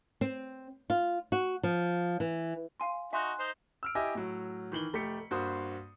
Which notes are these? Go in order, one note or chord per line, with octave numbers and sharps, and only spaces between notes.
C4
F4
F#4
F3
E3
F5 G#5 C6
D#4 F#4 E5 G#5 C6 F#6
D#4 C5
E6 F6 D7
E4 G4 D#5 E5 G#5
A2 F#3
D#3 E3 F#7 G7
F1 A3 G4 B6 C#7
G2 A#3 F#4 C5 C6 D#6